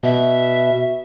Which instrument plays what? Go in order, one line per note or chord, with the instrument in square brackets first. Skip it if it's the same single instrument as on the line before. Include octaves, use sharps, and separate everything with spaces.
[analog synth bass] B2 [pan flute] E5